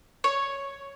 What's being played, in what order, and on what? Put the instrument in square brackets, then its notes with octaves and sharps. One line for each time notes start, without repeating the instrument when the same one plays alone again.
[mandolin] C#5